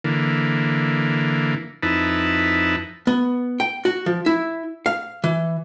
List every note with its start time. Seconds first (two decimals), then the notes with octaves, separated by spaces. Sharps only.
0.04 D3 E3 A#3
1.83 F2 D#4 E4 B4 A5
3.07 B3
3.60 G5
3.85 F#4
4.06 F3
4.26 E4
4.86 F5
5.24 E3